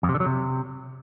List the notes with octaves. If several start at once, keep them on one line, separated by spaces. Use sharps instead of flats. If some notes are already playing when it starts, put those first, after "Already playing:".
F2
C3
D3
F#3
C3